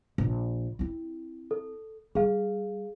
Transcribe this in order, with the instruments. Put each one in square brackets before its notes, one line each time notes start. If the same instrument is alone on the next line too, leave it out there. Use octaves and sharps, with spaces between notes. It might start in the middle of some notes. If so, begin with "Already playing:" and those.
[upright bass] A#1
C4 E4
[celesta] A4
[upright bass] G3 [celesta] G#4 F5